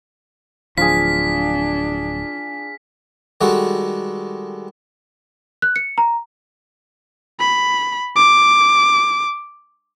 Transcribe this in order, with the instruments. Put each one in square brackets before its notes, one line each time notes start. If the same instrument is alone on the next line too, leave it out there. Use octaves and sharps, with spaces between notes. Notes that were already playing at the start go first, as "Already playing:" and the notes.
[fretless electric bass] D1 F3 [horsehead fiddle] D4 [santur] F4 G#4 [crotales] B6
[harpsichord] D#3 G3 G#3 F#4 A4
[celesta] F#6
C#7
A#5
[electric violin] B5
D6